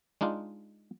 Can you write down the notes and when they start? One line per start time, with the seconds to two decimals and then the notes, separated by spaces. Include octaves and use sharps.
0.21 G#3 D4 D#4 F4